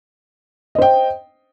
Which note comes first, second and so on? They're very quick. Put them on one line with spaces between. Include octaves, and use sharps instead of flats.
D#5 C5 G5